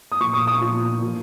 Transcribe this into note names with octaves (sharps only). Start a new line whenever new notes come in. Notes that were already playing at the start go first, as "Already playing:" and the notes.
D#6
A#2 F3 C#6
D#6
D#6
A#2 F3
A#2 F3